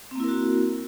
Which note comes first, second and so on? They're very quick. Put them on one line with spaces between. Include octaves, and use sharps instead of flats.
C4 A#3 E4 A#4 F#4